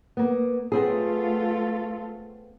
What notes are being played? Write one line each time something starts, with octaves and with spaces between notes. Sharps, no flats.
A#3 B3
A3 B3 C4 F4 G#4 A4